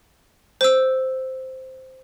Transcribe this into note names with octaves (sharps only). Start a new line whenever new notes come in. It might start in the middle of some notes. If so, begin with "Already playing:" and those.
C5 E6